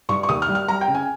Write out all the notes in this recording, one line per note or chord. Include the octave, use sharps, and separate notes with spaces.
G2 C#6
C#6
D#2 D#6
F6
G3
F6
G3 A#5
G5
C#3
G#5